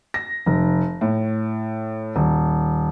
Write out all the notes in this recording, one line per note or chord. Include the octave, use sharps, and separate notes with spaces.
A#6
F1
A2
D#1